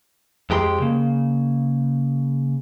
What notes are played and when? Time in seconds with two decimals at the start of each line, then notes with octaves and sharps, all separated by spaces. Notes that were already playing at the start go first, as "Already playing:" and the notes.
0.50 F2 G#3 G4 A#5 C6
0.80 C#3 A#3